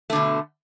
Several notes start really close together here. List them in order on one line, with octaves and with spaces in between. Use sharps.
A3 D3 B2